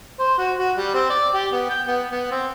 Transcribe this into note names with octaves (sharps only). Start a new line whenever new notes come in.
C5
F#4
F#4
G3
C4
D5
G4
B3
G5
B3
B3
C4